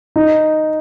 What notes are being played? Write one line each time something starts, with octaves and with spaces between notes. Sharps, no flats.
D#4